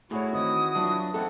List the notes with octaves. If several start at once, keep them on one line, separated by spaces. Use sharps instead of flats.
A2 A3 E4 F#4 G#4 C#5
D#3 E3 C4 D#5 D#6
E3 F#3 D4 F4
A3 C4 D#4 E4 A4 F#5